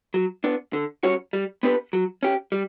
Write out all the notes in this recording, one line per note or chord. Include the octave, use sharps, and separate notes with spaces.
F#3
B3 D4
D3
G3 C#4 F#4 C#5
G3
B3 D4 G4 B4
F#3
C#4 G4
G3